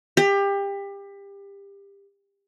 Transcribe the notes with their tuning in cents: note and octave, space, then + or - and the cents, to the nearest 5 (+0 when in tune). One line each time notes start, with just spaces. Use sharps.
G4 +25